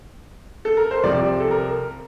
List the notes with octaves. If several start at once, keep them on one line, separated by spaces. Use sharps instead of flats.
A4
A#4
C5
C2 C3 F3 D5
A4
A#4